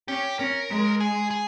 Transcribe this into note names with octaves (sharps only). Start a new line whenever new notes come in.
C#4 G4
C#4 A#4
G#3
G#4
G#4